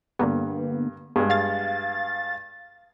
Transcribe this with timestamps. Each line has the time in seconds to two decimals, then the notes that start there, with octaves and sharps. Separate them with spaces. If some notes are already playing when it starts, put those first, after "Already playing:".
0.19 G2 D3 A#3 B3
1.16 G2 G#3 B3
1.30 F5 A6